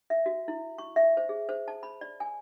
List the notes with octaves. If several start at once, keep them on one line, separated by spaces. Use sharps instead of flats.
E5
F#4
E4
C#6
E5
C5
G#4
C5
A5
B5
D5
G#5